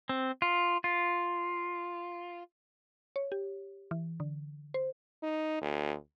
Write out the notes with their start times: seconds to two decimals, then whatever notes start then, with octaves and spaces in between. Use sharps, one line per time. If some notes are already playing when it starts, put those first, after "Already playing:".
0.09 C4
0.42 F4
0.84 F4
3.16 C#5
3.32 G4
3.91 E3
4.20 D3
4.74 C5
5.23 D#4
5.61 D2